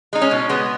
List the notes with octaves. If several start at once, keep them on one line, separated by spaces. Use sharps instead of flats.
G#3 D#4
C#4
B2
G#3 B3